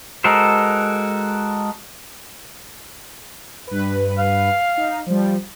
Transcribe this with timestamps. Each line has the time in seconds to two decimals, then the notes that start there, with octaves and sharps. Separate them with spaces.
0.24 G#3 F#4 A4 A#4 C5
3.67 G2 B4
4.19 F5
4.77 D#4
5.06 F3 G3